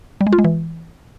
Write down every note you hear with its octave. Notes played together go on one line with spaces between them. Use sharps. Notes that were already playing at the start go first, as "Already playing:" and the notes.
G3
G#3
F4
G#3
E3